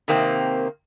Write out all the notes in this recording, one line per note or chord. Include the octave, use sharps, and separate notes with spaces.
C3 D#3 A#3 C4